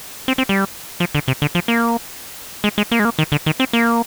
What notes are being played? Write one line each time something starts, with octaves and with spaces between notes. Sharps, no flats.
C4
C4
G3
F3
D3
C3
D3
F3
A#3
G#3
G#3
A#3
G#3
A#3
D#3
D3
D#3
C4
A#3